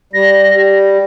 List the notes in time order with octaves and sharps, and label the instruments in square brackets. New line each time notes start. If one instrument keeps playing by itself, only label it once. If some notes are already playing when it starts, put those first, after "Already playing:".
[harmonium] G3 [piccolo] A#6
[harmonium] G3 [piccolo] A#6